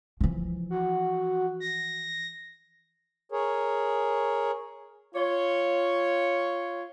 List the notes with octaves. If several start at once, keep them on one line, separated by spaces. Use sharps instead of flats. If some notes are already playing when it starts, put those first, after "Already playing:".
E3 F3
F#4
A#6
G#4 A#4 C#5
F4 C#5